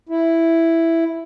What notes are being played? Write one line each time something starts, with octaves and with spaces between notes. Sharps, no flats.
E4